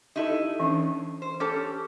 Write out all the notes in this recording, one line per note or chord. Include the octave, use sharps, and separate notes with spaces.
D#4 E4 G4 A4 D#5
E3 C#4 D4
C5
C#4 G4 A4 D6